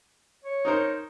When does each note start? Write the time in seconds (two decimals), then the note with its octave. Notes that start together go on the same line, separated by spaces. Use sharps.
0.45 C#5
0.65 D#4 A#4 C5